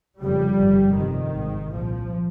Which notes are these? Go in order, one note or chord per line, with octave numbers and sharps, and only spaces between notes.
F1 F2 C#3 G3
G1 G2
F1 F2 C3 D#3
G#1 G#2
C2 A#2 F3